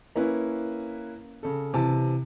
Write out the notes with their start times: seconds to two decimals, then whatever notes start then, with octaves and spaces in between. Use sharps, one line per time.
0.16 A#3 C#4 E4 B4
1.43 C#3 A4
1.74 C3 E3 A5